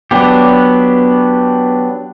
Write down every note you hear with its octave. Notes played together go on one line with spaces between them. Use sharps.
F#3 B3 D4 G4